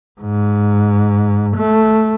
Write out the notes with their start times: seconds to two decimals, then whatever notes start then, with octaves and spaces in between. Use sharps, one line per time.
0.21 G#2
1.56 A3